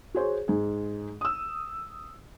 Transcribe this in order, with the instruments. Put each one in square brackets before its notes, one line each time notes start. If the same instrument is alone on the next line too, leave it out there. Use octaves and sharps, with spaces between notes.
[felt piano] F#4 G#4 C5 C#5
G#2 G#4
D#6 E6